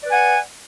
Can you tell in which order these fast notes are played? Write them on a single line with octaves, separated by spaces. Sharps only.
D5 B4 G#5 F#5